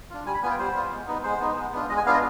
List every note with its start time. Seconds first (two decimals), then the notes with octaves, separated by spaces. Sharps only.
0.10 D4 F4
0.26 G3 G#5
0.34 B5
0.43 B3 F4 G#5
0.51 G5
0.59 G3 C5
0.76 B3 F4
0.92 G#3
1.08 B3 D#4
1.24 G#3 C5
1.41 B3 D#4
1.56 G#3
1.72 B3 D4 F4
1.89 G#3 D#5
1.97 G#5
2.06 B3 D4 F4 F5
2.14 D#5